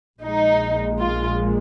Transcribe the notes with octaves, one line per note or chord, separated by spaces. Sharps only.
A#1 A#2 G#3 D#4
F4